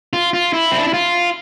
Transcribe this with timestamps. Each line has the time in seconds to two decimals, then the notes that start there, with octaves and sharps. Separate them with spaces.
0.13 F4
0.33 F4
0.53 E4
0.72 C4
0.78 D4
0.86 E4
0.93 F4